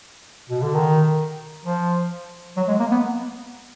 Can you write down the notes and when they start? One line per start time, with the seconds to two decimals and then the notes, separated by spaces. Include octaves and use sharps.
0.50 B2
0.62 D3
0.74 D#3
1.65 F3
2.57 F#3
2.68 G#3
2.80 A#3
2.91 B3